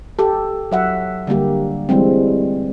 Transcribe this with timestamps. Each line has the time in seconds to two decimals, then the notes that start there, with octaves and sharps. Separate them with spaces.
0.19 G4 A4
0.72 F#3 E5 F#5
1.27 D3 G3 A#3 G4
1.89 E3 G3 G#3 C4